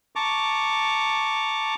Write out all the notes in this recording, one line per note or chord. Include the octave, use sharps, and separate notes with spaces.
A5 A#5 C#6 D6